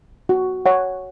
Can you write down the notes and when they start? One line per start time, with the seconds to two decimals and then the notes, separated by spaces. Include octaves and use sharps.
0.29 F#4
0.66 C#5 F#5